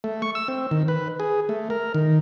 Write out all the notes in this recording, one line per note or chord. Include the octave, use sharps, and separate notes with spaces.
A3
C#6
E6
C4
D#3
B4
G#4
A3
A#4
D#3